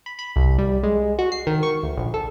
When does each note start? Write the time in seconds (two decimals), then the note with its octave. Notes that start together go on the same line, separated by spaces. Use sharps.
0.06 B5
0.19 B5
0.36 C2
0.58 G3
0.83 G#3
1.19 F#4
1.32 C7
1.47 D#3
1.63 C#6
1.83 D2
1.97 A#1
2.14 A4